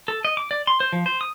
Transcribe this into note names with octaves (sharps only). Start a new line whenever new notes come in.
A4
D#5
D6
D5
C6
C5
F3
C5
D#6